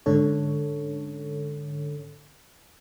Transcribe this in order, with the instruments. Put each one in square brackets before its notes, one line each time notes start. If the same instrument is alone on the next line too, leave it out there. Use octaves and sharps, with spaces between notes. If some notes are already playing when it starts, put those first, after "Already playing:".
[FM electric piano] G#2 D3 C#4 A4 C#5